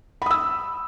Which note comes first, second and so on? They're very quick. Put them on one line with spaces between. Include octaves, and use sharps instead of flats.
B5 D#6 E6